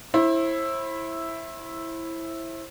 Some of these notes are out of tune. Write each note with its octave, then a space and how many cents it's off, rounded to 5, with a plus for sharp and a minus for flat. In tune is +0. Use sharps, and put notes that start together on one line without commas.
E4 +0 C5 +40